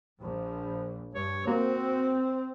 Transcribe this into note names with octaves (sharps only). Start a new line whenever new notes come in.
A#1 F3
G2 C#5
A#3 C4 F#4